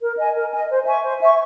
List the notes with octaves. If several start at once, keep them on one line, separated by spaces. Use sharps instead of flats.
A#4
D#5 G#5
A#4
D#5 G#5
C5
E5 G#5 C#6
C5
E5 G#5 C#6